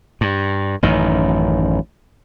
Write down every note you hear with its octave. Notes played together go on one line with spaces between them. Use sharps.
G2
A1 F#2 D#3